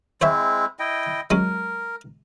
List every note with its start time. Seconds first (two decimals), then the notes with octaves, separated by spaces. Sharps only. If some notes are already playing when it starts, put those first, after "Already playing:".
0.21 G#3 C4 E4 C5 C#5 E5
0.79 E4 D#5 G5
1.30 F#3 G#3 C#4 A#4